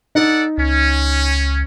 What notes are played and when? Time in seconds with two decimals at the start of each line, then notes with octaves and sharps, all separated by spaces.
0.15 D#4 A4 D5 F#5
0.58 C#2 C#4